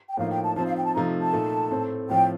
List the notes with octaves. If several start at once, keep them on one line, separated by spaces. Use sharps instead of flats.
G5
A2 F3 A#3 D#4 F5
G5
A5
F3 C4 D#4 A5
F5
G5
A5
C3 F3 A3 D#4 A#5
A5
A#2 A3 D#4
A2 A3 C4
A2 F3 C4 G5